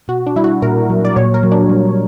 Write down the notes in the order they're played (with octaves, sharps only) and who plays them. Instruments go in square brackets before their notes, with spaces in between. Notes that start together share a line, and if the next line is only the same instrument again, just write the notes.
[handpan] B2 [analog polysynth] F#4
[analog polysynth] D4
[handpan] G3 [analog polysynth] E4
[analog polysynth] F#4
[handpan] A#2 [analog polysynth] A#4
[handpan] F#3
[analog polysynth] D5
[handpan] A#2 [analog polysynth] C#5
[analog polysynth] A#4
[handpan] F#3
[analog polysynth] D4
[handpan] G3